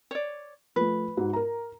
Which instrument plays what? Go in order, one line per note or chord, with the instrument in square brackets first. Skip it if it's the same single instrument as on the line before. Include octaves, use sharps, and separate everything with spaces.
[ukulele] C#5 D5
[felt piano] F3 A3 [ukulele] B4
[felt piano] G#2 F#4
A#4 A#5